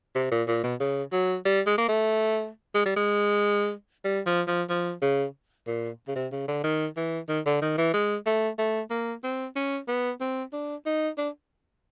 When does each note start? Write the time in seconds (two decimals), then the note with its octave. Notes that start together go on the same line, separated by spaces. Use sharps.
0.15 C3
0.31 A#2
0.48 A#2
0.63 B2
0.80 C#3
1.12 F#3
1.45 G3
1.66 G#3
1.78 A#3
1.88 A3
2.74 G#3
2.85 G3
2.96 G#3
4.05 G3
4.26 F3
4.47 F3
4.69 F3
5.02 C#3
5.67 A#2
6.08 C#3
6.15 C3
6.32 C#3
6.48 D3
6.64 D#3
6.96 E3
7.28 D#3
7.46 D3
7.62 D#3
7.78 E3
7.93 G#3
8.26 A3
8.58 A3
8.90 A#3
9.24 C4
9.56 C#4
9.88 B3
10.21 C4
10.53 D4
10.86 D#4
11.18 D4